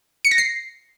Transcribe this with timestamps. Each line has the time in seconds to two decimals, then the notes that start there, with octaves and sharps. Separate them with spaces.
0.25 C#7
0.31 A#6
0.38 C7